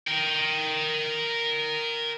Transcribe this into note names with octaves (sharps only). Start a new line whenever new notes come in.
A#4 G5